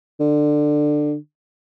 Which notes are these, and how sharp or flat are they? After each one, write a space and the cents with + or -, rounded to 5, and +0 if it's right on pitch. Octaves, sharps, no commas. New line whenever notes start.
D3 +15